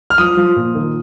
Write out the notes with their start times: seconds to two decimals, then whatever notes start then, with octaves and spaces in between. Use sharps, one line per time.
0.10 F6
0.18 F3 D#6
0.37 F3
0.56 A#2
0.75 D#3